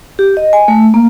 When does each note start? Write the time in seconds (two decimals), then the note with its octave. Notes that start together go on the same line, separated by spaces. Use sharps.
0.19 G4
0.37 D#5
0.53 G#5
0.68 A3
0.94 A#3